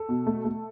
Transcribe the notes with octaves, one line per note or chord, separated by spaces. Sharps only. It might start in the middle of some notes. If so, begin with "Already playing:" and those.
Already playing: A4
B2
A3
A3